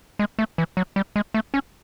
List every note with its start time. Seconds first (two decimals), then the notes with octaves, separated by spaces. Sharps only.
0.19 G#3
0.39 A3
0.58 E3
0.77 F#3
0.96 G3
1.16 G#3
1.34 A3
1.54 C#4